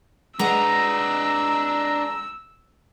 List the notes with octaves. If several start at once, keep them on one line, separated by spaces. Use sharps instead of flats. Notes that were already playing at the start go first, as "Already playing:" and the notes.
G#3 D4 B4 D#5 F#5 A#5 E6